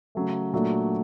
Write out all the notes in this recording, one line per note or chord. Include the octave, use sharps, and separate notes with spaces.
C#3 F#3 A3
A#2 F#3 A3 D4